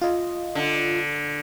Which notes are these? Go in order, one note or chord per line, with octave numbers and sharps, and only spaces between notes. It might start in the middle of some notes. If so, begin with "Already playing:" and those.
F4 D#5
D3